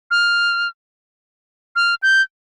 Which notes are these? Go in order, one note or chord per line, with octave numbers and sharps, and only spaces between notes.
F6
F6
G6